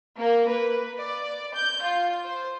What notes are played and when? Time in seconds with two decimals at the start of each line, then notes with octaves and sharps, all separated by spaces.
0.17 A#3
0.48 B4
0.99 D5
1.55 G6
1.84 F4
2.25 C5